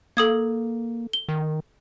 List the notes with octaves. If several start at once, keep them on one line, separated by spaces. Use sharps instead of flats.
A#3 A4 D#6 G#6
G7
D#3